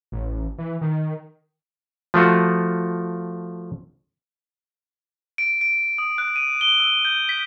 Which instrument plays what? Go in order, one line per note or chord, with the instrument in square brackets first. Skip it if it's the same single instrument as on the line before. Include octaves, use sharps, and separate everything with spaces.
[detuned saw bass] A1
E3
D#3
[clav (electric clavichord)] F3 A3 F4 F#4
[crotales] D7
D7
D#6
F#6
D#7
G7
E6
G6
B6